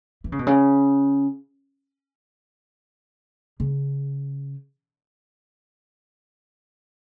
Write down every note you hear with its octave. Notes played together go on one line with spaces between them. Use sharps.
E3
C#3
B2
C#3
C#3